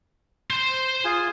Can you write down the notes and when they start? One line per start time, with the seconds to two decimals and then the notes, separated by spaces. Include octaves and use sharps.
0.50 C5 C6
1.05 F4 G#4 G#5